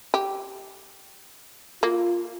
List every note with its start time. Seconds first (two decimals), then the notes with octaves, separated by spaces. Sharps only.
0.14 G4
1.83 A#3 F4